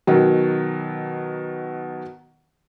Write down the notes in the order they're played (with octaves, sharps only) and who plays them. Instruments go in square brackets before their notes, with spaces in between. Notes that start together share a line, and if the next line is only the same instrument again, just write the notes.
[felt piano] B2 D#3 F#3